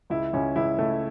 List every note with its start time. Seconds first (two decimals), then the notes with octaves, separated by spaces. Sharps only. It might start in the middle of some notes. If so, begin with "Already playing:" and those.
0.10 C#2 E4
0.33 C#2 C#4
0.56 C#2 E4
0.78 C#2 A3